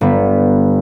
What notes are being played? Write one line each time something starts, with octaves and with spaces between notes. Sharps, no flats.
G1 B3